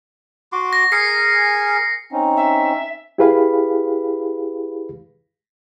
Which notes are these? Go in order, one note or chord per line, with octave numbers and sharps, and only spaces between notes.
F#4 C6 D6
A#6
G#4 A#4 G#5 C7 C#7
C4 C#4 D#4
E5
E4 G4 G#4 B4 F5 B5